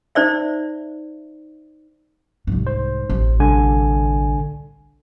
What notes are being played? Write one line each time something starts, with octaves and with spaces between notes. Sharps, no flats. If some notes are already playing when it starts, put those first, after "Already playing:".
D#4 C5 D5 E5
C2 G#2
C5
A1
C2 D3 G#5